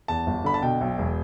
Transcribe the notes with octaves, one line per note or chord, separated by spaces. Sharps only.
E2 A5
G1
D3 B5
A5
B2 G5
B1
E1